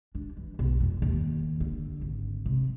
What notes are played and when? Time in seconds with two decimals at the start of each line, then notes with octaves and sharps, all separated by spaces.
0.15 D4
0.37 E3
0.59 B1
0.80 F2
1.02 D#2
1.60 D3
2.01 G#1
2.46 C3